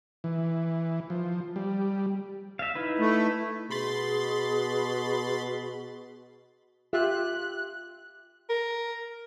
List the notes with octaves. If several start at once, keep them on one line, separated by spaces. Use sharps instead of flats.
E3
F3
G3
E5 F5
D#4 E4 B4
A3
B2 G#4 B5 C6 A6
F4 G4 E5 F#6
A#4